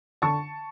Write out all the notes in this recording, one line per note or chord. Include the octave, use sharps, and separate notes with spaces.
D3 A5 C#6